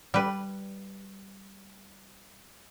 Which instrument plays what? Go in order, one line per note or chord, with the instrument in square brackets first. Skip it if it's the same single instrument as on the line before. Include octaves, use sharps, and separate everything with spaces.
[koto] G3 B4